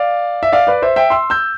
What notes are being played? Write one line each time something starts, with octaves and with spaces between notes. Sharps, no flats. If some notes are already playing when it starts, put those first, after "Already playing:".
Already playing: D5 F5
E5
D5 F5
B4 D5
C5 E5
E5 G5
C6 E6
E6 G6